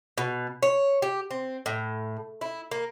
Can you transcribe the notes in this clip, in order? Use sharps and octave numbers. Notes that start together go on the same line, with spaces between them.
B2
C#5
G4
C4
A2
E4
A#3